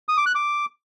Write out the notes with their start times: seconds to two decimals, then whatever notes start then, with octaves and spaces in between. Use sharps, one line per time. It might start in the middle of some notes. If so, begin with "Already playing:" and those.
0.09 D#6
0.17 D6
0.26 F#6
0.35 D6